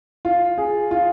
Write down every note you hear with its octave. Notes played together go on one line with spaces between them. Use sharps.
F4
G#4
F4